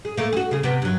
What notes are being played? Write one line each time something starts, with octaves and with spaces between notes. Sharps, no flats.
G#4
A3 A#3
F#4 G#4
C#3 G#4
C3 B3
G2 F#3